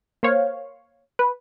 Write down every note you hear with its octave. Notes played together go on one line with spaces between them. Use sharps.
A#3 C5 C#5 F5
B4